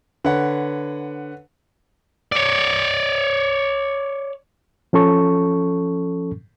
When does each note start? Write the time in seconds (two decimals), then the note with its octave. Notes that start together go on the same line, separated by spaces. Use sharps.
0.25 D3 B4 C#5 F#5
2.32 C#5 D5
4.93 F3 C#4 A4 C#6